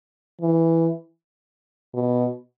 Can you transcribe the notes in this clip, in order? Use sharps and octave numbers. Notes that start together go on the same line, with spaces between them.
E3
B2